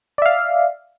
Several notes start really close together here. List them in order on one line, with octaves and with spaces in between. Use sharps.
D5 E5 F5